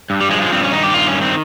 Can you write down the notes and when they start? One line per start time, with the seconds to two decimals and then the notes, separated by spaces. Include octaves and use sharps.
0.10 G2
0.21 G3
0.30 F3 G#3
0.42 G#3
0.52 G2 C4
0.63 C#4
0.73 D#3 D#4
0.83 G4
0.94 G2 F4
1.08 C#4
1.15 D#3
1.22 C4